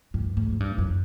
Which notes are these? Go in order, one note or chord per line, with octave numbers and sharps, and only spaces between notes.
G2
G#2
G#2
G2
F#2